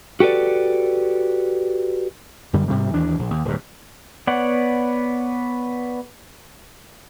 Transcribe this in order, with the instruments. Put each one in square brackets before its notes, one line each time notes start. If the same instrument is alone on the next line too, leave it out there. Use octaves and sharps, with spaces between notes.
[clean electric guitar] F#4 G4 A4 B4 D5
[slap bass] F#2 D3 G3
G#2 C3 G3
D#2 E3 D4
A#1
D#2
D1 G2
[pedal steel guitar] B3 C#5 D5 F#5